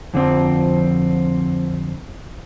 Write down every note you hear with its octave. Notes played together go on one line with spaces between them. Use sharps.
F2 D3 F3 C4